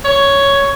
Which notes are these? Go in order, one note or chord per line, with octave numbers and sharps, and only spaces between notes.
C#5